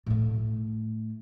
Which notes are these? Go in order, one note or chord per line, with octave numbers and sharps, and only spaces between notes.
A2 A3